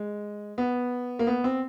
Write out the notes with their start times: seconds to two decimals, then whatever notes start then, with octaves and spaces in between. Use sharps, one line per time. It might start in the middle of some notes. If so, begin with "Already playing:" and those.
Already playing: G#3
0.58 B3
1.19 A#3
1.27 B3
1.44 C4